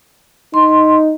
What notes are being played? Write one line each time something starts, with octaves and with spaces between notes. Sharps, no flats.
D#4 C6